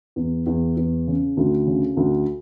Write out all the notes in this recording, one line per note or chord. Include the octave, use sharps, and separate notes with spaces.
E2
E2
E2
C#3
D2
C#3
D2